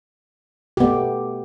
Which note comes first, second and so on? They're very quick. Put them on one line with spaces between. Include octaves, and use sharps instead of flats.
G4 B3 A3